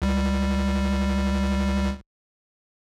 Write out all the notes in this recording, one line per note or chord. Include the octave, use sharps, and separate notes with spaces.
C#2 G3